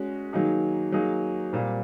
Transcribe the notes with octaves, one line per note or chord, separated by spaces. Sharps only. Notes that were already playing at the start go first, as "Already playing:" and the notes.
Already playing: G#3 C#4 F#4
D#3 F#3 A#3 D#4 G#4
F#3 A#3 D#4 G#4
A#2 G3 C4